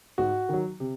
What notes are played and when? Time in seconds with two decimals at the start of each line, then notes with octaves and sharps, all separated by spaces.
0.18 G#2 F#4
0.49 D#3 F#3
0.80 C3